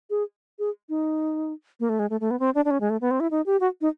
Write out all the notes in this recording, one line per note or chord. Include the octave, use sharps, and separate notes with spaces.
G#4
G#4
D#4
A#3
A3
G#3
A3
A3
B3
C4
D4
D4
C#4
G#3
A3
B3
C4
E4
D#4
G4
F#4
D#4